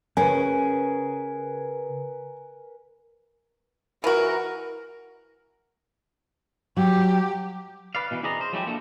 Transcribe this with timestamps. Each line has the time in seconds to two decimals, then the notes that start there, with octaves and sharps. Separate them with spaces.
0.17 C#3 C#4 G#4 A#4 B4 G#5
4.04 E3 F#4 A#4
6.77 F#3 G4
7.95 B4 D5 F5
8.11 B2 E3
8.23 C4 E4 G#4 D5 D#5 A#5
8.41 C5
8.53 F3 F#3 G#3 A3 E4 G4
8.66 A#3 D4 A4